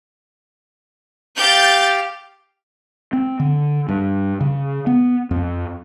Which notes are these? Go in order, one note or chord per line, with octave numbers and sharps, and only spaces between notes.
G4 F5 G6 A6
C4
D3
G2
C#3
B3
F2